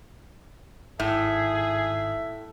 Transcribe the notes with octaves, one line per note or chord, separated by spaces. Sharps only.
G#1 A2 G#4 E5